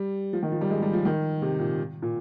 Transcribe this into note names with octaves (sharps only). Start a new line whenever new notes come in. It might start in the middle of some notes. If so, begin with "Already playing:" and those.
Already playing: G3
F3
D#3
F3
G3
G#3
G3
F3
D#3
C3
A#2
A#2